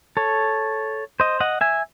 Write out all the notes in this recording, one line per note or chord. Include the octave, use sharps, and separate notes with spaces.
A4 C#5
C5 D#5
D#5 F#5
E5 G#5